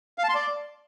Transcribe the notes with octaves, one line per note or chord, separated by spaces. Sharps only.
F5
A5
C6
D5